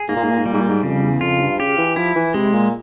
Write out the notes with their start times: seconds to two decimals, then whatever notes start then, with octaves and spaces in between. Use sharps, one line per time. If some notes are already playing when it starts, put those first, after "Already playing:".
Already playing: G#4
0.08 G#2 A#3
0.16 A#2
0.24 G#2
0.31 A#2
0.38 G#2
0.45 A#2 G3
0.53 G#2
0.61 A#2
0.69 G#2
0.83 F2 C#3
1.03 E2
1.21 F2 F4
1.41 G2
1.59 C#3 G4
1.78 E3
1.96 F3 E4
2.16 E3
2.34 C3 G#3
2.53 A#2